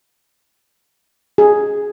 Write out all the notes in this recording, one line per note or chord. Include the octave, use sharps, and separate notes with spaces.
G#4